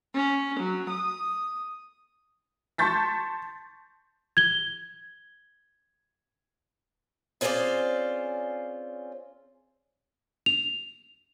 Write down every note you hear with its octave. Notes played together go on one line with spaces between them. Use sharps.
C#4
F#3
D#6
A5 C6 C#6 G6 A6 B6
G#6 G7
C4 C#4 F4 G#4 C5 D5
F7